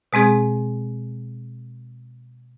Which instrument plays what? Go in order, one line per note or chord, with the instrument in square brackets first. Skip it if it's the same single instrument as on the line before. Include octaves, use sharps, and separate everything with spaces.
[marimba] B2 G#3 C4 G#4